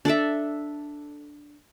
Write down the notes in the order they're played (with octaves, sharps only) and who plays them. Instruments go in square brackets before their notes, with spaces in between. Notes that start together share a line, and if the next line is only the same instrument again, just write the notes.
[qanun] D4 A4 D5 E5